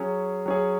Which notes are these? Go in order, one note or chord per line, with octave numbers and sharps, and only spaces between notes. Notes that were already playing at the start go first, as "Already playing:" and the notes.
Already playing: F#3 C#4 G#4
F#3 C#4 G#4